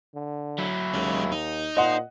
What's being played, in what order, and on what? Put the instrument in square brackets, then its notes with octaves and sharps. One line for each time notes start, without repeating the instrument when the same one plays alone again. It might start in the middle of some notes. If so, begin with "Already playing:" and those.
[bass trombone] D3
[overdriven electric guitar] F#3 E4
[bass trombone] D#2 [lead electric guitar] G#3 C#4
[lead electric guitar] D#4
[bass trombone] A#2 [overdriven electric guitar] C5 C6 [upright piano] D#5 F#5